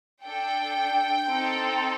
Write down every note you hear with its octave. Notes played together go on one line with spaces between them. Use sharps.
D4 A4 G5
C4 D#4 A4